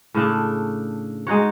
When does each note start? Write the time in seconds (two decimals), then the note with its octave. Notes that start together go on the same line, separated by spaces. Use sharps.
0.14 A2 C#3 D4 A4
1.27 G#3 D#4 F#4 C#5